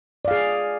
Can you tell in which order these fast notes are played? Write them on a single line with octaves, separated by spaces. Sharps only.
D5 F5 G#4